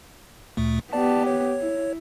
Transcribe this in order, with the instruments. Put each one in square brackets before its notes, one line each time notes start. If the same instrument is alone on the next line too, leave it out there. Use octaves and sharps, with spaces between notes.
[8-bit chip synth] D2 A#2 A3
[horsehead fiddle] B3 G4 [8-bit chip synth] D5 A5
[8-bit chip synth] C#5
[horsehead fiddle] E4